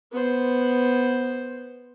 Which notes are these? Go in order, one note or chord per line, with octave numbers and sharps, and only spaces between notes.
B3 C5